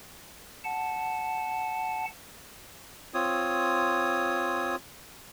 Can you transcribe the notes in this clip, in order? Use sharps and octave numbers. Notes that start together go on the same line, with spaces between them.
F#5 A5
C4 F4 C#5 D#6